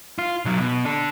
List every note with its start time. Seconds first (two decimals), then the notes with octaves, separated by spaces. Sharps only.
0.19 F4
0.45 B1 F#3
0.58 B2
0.85 D4 A4